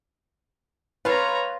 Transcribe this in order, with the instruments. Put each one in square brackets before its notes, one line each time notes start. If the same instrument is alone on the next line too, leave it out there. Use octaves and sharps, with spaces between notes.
[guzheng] F4 F5 [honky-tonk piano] B4 [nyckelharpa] C#5 A#5